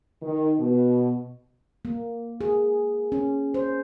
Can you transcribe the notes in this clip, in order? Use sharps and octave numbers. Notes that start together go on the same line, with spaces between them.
D#3
B2
A#3
G#4
C#4
C5